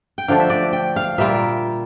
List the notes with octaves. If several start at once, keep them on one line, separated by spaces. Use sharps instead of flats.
G5
D3 F3 A3 D4 F5
E5
D5
G5
F5
A#2 G3 A#3 F4 E5